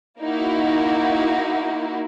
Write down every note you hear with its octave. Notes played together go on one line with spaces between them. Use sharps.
A#3 D#4 E4 F#4